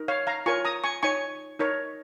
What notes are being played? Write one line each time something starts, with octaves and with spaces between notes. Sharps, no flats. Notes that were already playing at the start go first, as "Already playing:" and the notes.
Already playing: D#4 A#4
C#5 F5
F5 A#5
F4 A#4 C#5 G#5 C#6
A#5 D#6
G#5 C#6
D#4 C#5 G#5 C#6
D#4 A#4 C#5